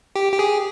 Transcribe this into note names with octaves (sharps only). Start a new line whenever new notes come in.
G4
G4
G#4